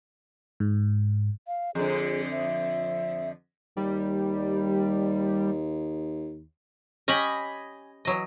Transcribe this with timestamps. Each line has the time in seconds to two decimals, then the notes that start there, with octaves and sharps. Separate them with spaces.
0.60 G#2
1.47 F5
1.75 F2 D3 G#4
2.31 E5
3.77 D#2 G3
7.08 C#4 G4 D#5 G#5 B5
8.05 E3 F#3 D#5